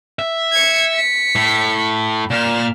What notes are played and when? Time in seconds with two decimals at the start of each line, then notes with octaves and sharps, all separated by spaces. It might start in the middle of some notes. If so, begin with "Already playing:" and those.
0.19 E5
0.53 G#6 C#7
0.92 B6 C#7
1.35 A2
2.30 A#2 F6 E7